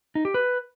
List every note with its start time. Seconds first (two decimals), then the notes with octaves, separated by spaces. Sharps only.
0.15 D#4
0.25 G4
0.34 B4